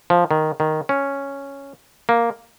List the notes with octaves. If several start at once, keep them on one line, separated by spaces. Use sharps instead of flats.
F3
D#3
D#3
C#4
A#3